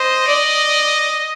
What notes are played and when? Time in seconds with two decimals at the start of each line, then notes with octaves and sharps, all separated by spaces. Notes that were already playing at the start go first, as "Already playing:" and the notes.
Already playing: C5 D#5
0.27 D5